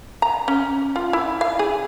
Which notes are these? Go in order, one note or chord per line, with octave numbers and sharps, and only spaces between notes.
A#5
C#4
F4
E4
F5
G#4